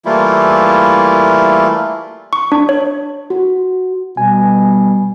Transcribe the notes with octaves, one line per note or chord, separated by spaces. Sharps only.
E3 G3 A3 A#3 E4 F4
C#6
D4
C#5
F#4
B2 G3 G#5